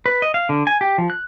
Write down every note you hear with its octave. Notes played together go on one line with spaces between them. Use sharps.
B4
D#5
F5
D3
G#5
G4
F3
F#6